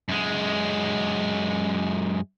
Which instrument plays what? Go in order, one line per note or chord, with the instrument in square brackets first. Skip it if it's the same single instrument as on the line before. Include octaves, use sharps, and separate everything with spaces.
[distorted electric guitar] F#2 G#3